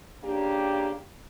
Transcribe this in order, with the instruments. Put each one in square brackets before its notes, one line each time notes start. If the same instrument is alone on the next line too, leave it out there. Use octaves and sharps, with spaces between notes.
[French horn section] C#3 A#3 D4 G4